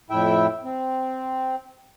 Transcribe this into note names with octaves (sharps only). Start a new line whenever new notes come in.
F2 A2 E4 E5 G5
C4